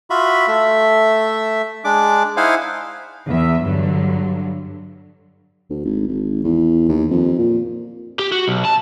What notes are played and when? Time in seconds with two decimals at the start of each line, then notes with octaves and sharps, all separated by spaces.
0.10 F4 F#4 E5 B5
0.48 A3 E5
1.84 G#3 D4 D6
2.37 D#4 E4 C5 F5 F#5 G#5
3.28 E2 E5
3.64 G2 D3 F#3
5.70 D2
5.85 G#1
6.08 G#1
6.44 E2
6.88 D#2
7.11 F2
7.38 A#2
8.19 G4
8.32 F#4
8.48 B1
8.65 A5